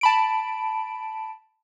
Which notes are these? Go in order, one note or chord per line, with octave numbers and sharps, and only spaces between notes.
A5 B5 D7